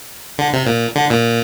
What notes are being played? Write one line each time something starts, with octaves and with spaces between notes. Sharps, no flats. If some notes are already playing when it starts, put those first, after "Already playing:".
D3
C3
A#2
D3
A#2